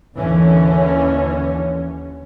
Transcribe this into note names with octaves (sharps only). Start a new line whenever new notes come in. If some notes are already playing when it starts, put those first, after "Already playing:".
D#2 D3 E3 C#4